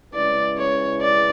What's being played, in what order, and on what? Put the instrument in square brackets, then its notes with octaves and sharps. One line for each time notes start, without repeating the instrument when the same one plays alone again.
[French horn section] C#3 G#3 C#4 E4 B4 [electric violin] D5
[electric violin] C#5
D5